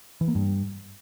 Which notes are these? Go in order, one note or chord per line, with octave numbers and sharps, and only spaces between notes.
E3
A#3
G2